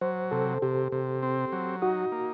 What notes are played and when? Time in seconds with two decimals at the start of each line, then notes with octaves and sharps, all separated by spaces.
0.01 F#3 C5
0.31 C3 A4
0.62 C3 G4
0.92 C3
1.23 C4
1.52 F#3
1.82 D#4 F#4
2.12 A#3